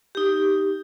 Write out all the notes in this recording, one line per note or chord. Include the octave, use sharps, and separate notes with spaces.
D#4 G4